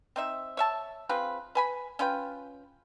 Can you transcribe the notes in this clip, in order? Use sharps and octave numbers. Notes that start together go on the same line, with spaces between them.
C4 D#4 E5
C#5 E5 A5
C4 F4 G#4 B4
B4 G#5 B5
C#4 F4 B4 G5